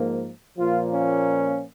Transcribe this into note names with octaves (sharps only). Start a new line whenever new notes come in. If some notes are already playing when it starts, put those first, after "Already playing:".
Already playing: G#2 F3 A#3
A#2 F3 A#3 F4
C#4